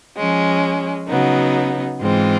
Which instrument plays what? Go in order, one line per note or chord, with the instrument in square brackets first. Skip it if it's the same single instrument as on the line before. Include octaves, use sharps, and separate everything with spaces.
[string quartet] F3 G#3 C#4
C#3 F#3 B3 D#4
G#2 E3 G#3 C4 F4